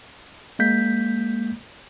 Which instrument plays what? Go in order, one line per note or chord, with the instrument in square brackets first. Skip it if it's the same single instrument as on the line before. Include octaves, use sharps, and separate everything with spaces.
[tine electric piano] G#3 A#3 G6 B6